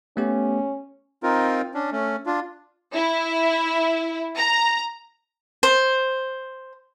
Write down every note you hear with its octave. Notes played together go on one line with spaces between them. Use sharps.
A3 B3 C#4 G4
C4 D#4 F4 A#4
C#4 D4
A3 C#4
D4 F4
E4
A#5
C5